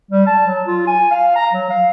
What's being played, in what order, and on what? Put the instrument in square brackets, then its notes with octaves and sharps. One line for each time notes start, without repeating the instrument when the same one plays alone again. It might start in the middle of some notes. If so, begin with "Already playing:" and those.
[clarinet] G3
A5
F#3
F4
G#5
F5
A#5
F#3
F5